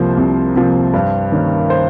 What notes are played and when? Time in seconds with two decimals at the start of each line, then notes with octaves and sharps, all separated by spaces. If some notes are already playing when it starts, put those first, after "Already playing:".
Already playing: C2 C3 F3 A#3 C5
0.17 C2
0.56 C3 F3 A#3
0.94 G2
1.32 D#3 A#3 C#4
1.70 C5